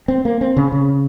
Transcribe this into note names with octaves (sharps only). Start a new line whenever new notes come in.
C4
A#3
C4
C#3
C#3